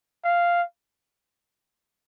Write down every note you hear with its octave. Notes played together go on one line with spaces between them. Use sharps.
F5